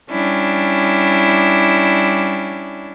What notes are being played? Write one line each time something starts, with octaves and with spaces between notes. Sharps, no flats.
G3 C#4 D4 E4